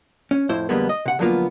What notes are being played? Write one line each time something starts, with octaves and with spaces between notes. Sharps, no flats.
C#4
F2 A2 E4 C5
F2 D3 G3 G#3 A#3 B3
D#5
C3 F#5
D2 F3 F#3 A#3 B3 F4